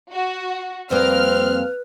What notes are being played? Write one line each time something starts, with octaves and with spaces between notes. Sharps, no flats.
F#4
F2 G3 A#3 C4 B4 F6